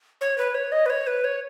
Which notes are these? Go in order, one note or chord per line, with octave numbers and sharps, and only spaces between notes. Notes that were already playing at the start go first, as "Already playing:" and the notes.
C#5
B4
C#5
D#5
B4
C#5
B4
C#5